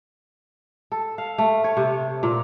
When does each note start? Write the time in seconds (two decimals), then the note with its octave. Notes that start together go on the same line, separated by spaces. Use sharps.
0.92 A4
1.18 F5
1.38 A3
1.64 C#5
1.77 C3
2.23 A#2